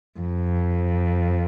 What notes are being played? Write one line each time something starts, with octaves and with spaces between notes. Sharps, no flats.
F2